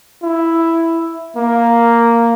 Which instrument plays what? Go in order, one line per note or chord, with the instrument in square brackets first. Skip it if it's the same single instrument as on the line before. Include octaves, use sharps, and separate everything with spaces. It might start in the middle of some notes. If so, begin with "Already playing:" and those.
[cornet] E4
A#3